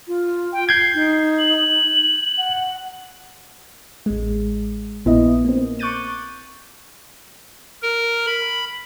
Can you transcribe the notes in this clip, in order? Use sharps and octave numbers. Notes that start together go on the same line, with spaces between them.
F4
G5
G6 G#6 C7
D#4
F#7
F#5
A1 G#3
A#1 A#2 B3 E4 D#5
A#3 C4
C#6 D6 F#6 G6 A6 D#7
A#4
B5